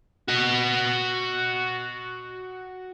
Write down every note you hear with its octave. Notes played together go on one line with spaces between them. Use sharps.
F#4 D#5